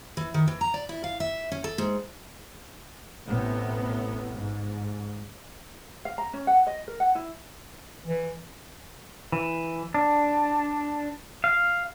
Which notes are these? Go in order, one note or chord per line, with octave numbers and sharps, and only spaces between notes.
E3
D#3
E3
A#5
D5
E4
F5
E5
C#4
A4
G#2
A1 A2 C3 B3
G#2
F5
A#5
C#4
F#5
D#5
A#4
F#5
E4
E3
E3
D4
F5